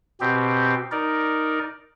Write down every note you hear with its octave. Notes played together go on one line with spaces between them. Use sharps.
B2 C4 G4
D#4 A#4 D5